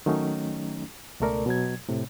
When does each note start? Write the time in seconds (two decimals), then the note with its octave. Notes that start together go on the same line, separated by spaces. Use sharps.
0.06 D#3 F#3 A3 C#4 D#4
1.20 C#2 B2 A3 A4 A#4 D5
1.46 B2 F#3 G#6
1.89 A2 C3